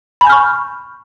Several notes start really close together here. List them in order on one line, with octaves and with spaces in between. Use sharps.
B5 G#5 G6 F6 C#6